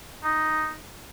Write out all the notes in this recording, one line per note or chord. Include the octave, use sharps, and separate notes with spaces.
D#4